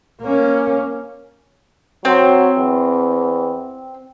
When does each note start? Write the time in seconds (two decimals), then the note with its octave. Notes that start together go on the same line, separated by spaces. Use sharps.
0.22 A#3 C#4
2.05 F#3 C4
2.56 E2